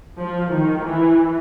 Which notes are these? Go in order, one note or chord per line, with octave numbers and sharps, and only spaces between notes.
F3
D#3
E3